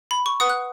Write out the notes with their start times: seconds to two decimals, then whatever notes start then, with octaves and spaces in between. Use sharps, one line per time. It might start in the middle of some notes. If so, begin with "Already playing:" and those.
0.11 B5
0.26 C#6
0.40 B4 F#5 D#6
0.50 F#6